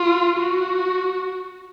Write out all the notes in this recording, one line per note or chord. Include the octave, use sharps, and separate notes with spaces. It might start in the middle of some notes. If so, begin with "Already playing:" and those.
Already playing: F4
F#4